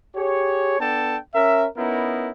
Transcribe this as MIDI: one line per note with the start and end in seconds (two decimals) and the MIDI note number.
0.16 0.77 67
0.16 0.77 68
0.16 0.77 73
0.80 1.17 59
0.80 1.17 62
0.80 1.17 69
0.80 1.17 79
0.80 1.17 81
1.35 1.67 61
1.35 1.67 70
1.35 1.67 76
1.77 2.31 59
1.77 2.31 61
1.77 2.31 63
1.77 2.31 64
1.77 2.31 70